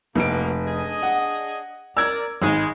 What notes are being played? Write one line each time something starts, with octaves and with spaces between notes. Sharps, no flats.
F1 B2 A#3 D7
D4 G#4 D#5
F#5
A#4 D5 E6 G#6
G#1 G#3